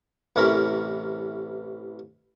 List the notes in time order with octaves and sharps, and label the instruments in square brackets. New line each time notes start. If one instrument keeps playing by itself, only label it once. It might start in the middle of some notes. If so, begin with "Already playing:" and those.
[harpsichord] A1 C3 E3 C#4 A#4 B5